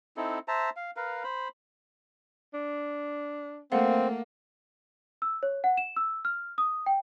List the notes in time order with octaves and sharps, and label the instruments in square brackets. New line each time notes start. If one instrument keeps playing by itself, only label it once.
[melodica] C4 D#4 E4 A4
C5 E5 A5 A#5
F5
A#4 B4 F5
C5 B5
[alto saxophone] D4
[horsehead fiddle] A3 A#3 [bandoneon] C4 [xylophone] F5 F#5
[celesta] E6
C#5
F#5
E7
E6
F6
D#6
G5